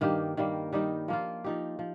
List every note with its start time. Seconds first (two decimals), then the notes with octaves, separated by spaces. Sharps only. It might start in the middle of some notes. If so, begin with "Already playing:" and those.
0.01 G2 D#3 A#3 G4
0.37 D#3 G3 A#3
0.73 D#3 G3 D#4 G4
1.08 F3 A#3 F4
1.44 F3 D#4 G4
1.79 F3